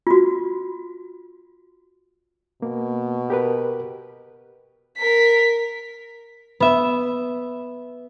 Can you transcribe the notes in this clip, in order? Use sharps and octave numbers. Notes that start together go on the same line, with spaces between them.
F4 F#4
B2 A#3
G4 A#4 B4
A#4 B6
B3 E5